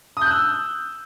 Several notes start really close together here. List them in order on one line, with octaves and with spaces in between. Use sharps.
D#6 G6 F#6 E6